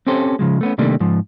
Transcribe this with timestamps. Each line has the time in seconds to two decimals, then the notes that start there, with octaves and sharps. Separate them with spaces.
0.07 C4 C#4 G4 A4 C5
0.39 C#3 F3 G#3
0.61 A3 B3 C#4
0.78 C3 D#3 G3 A3 A#3 D4
1.00 G#2 F3